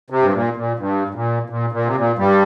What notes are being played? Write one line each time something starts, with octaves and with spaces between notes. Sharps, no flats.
C3
G2
A#2
A#2
G2
G2
A#2
A#2
A#2
C3
A#2
G2 G3